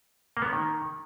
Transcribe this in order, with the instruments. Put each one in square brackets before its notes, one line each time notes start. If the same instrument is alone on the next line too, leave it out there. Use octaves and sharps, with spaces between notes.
[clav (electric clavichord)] A#3
B3
C#4
D#3